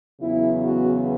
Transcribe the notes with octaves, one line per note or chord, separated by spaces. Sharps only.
E2 C#3 F#3 B3 E4
F#4